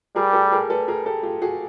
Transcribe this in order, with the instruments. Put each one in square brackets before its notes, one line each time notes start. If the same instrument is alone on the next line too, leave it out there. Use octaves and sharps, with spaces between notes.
[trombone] G3 [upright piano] G#4 A#4
[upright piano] G4 A4
G#4 A#4
A4 B4
G#4 A#4
G4 A4
F4 G4
F#4 G#4